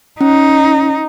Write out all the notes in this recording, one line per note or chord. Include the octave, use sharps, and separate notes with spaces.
C#4 D#4